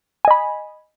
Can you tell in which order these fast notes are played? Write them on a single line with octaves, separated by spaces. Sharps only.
G#5 D#5 B5